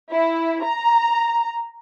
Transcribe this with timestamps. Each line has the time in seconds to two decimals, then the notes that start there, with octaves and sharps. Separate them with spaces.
0.13 E4
0.64 A#5